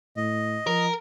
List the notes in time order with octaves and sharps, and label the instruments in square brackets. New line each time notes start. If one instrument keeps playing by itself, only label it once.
[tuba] A2 [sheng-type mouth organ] D#5
[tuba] F3 [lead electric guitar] A#4